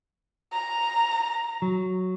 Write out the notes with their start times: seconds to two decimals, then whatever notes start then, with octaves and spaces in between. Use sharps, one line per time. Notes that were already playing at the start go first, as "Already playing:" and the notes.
0.52 A#5
1.62 F#3